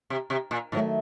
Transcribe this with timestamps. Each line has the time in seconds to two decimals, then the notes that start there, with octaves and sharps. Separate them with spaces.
0.10 C3
0.30 C3
0.51 A#2
0.72 A2 D#3 F#3 A3